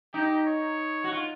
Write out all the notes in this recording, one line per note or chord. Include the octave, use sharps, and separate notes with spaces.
D#4 G4
C#5
F#4
F4